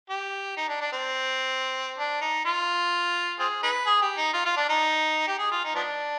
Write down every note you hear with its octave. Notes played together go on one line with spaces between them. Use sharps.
G4
D#4
D4
D4
C4
D4
D#4
F4
C4 F4 G#4
D#4 G#4 B4
G#4
G4
D#4
F4
F4
D4
D#4
G4
G#4
F4
D#4
F3 B3 D4